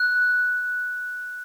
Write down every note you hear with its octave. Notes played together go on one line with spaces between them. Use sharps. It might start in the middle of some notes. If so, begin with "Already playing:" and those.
Already playing: F#6